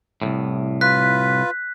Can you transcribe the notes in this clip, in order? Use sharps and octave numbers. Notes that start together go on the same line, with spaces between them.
C2 F2 A2
F4 B4 F#6 B6